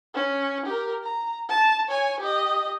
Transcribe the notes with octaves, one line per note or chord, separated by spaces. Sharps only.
C#4
G4 A#4
A#5
A5
C#5 G#5
G4 D#5